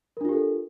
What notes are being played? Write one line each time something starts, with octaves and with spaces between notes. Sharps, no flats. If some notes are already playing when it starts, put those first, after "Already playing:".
D4 F4 G4 A4 A#4